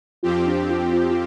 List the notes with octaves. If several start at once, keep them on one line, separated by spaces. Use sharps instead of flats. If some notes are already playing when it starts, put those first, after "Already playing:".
F2 F3 C4 F4 G4
D4
F4
F4
F4